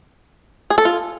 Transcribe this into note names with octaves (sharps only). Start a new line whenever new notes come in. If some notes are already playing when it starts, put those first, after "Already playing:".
G#4
A4
F4